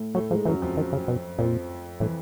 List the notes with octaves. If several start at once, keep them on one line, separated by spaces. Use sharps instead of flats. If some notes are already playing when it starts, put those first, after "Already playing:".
Already playing: A2 A3
A2 F#3 A3
G#2 F3 G#3
F#2 E3 F#3
F2 F3
D#3
C#3
B2
F2 A#2 F3
A2 E3